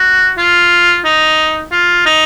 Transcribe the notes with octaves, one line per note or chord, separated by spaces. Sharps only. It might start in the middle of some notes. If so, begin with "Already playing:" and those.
Already playing: F#4
F4
D#4
F4
D#4